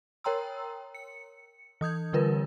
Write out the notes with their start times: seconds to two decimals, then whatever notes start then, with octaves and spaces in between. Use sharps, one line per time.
0.24 A#4 C#5 G5 A#5 C6 E6
0.95 C#7
1.81 E3 D#6 G6 G#6
2.13 D3 G3 F4 A#4 B4